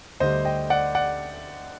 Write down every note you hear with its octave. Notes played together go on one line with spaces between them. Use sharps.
D2 D3 G3 C5 D#5
D#5 G5
D5 F#5
D5 F#5